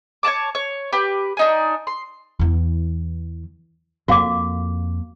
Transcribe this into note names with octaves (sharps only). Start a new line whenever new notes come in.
C#5 D5 A5 D6
C#5
G4 B4
D4 D#4 G#5
C6
E2 E3
F2 A#3 F#4 F5 D6